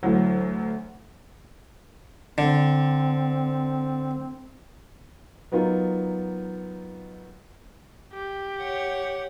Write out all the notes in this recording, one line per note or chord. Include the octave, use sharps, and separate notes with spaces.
D2 E3 F#3
D3 C4
F#3 B3 D#4 F4 A#4
G4
C#5 F#5